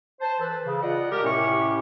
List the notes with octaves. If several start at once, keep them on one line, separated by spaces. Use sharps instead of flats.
C5 A5
E3 A4 B4
C#3
F4 D5 D#5 F#5
G#3 G4 A#4
A2 C3 C#4 G4 C#6